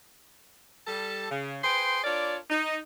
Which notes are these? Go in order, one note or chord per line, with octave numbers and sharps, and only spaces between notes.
G3 A4 A5
C#3
G#4 B4 C5 G5 C6
D4 F4 A#4 C#5 D5
D#4